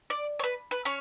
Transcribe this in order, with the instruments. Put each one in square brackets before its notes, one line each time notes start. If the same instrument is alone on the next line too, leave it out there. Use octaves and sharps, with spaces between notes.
[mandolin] D5
C#5
B4
B4
C#4 C#5